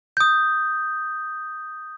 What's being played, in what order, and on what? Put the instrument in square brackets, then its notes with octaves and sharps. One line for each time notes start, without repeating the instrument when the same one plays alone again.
[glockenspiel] D#6 G6